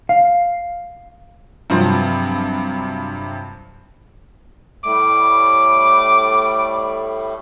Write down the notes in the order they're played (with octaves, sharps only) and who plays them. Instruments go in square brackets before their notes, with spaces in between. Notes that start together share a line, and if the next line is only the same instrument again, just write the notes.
[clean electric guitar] F5
[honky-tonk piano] G2 C3 F3 F#3 C4
[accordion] A2 G3 A3 [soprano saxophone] D6